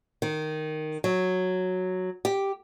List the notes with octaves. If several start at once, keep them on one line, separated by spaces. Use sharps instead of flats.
D#3
F#3
G4